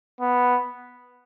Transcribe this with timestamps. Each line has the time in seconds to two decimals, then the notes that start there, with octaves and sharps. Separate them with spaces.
0.21 B3